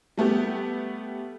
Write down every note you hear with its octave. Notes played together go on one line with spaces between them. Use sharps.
G3 A3 B3 G4